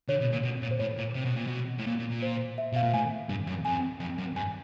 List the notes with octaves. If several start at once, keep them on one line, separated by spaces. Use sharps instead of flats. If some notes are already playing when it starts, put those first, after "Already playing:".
D3 C#5
B2
A#2
B2
A#2
C5
A2 C#5
A#2
C3
B2
A#2
B2
A2
A#2
A#2
A#2
C5
E5
B2 F5
A#2
A2 G#5
G2
F#2
F2 G#5
F2
F#2
G2 G#5